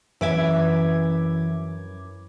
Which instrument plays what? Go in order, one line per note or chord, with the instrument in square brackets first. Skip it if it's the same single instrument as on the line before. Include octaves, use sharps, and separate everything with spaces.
[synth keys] F#2 D6 G#6 [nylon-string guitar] E3 E5